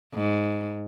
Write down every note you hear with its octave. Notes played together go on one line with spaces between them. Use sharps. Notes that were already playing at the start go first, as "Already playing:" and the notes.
G#2